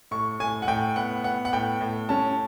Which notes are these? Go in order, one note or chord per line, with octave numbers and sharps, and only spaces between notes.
A2 C#6
A2 G#5
F#5
A2 G5
B3 F#5
B3 F#5
F#5
A2 G5
A2
C#4 A5